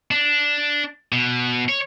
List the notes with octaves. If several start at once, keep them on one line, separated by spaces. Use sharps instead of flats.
D4
B2
C#5